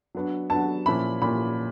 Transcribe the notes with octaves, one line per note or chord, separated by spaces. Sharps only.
F#3 B3 D4
F#3 B3 D4 A5
A#2 F3 A#3 C#4 E4 B5
A#2 F3 A#3 C#4 E4 B5